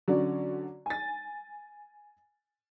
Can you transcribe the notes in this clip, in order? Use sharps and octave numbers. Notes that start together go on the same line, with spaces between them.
D3 F#3 C#4 F#4 D5
G#5 A6